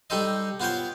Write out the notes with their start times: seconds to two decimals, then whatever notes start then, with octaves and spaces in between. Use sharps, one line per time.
0.10 G3 D#4 G4 A4 C5 D#5
0.60 B3 F4 C5 C#5 G5